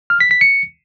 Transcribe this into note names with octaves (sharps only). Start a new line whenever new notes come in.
F6
B6
B6
C#7